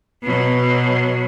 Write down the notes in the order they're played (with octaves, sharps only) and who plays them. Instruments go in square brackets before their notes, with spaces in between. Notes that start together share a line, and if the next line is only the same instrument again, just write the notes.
[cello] B2 F#3